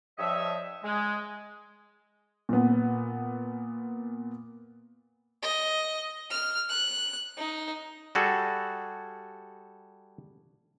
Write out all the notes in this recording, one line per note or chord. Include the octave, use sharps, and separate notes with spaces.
G2 F3 C#5 D#5 E5
G#3
A#2 B3
D#5
F6
F#6
D#4
G3 F#4 G#4 A4